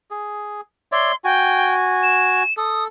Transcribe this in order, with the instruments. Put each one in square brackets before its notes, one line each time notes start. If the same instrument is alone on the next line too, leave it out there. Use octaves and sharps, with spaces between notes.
[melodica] G#4
[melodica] C#5 D5 E5 [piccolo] C6
[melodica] F#4 G#5 [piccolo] G5
[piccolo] E7
[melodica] A4 [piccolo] D#6